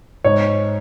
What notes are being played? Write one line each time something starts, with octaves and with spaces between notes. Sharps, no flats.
G#2 C#5